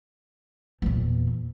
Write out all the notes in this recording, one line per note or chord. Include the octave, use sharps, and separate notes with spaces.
E2 A#2